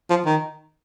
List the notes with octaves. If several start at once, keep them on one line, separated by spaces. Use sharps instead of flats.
F3
D#3